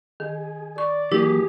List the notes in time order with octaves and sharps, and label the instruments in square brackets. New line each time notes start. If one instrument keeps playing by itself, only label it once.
[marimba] D#3 [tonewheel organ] G#4
[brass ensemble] D5 [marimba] C#6
[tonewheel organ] E3 F#3 A#3 [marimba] E4 [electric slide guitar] G4 G#4